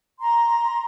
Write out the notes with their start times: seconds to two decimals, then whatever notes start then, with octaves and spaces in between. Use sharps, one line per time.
0.20 A#5 C6